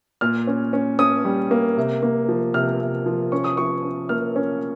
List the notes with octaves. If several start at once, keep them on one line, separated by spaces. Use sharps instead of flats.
A#2 F6
C#4
C#4
C#4 D#6
G3
A#3
C3
A#3
F3
C3 F6
C3
F3
C#4 C#6
D#6
F3 C#6
C#4
A#3 F6
C#4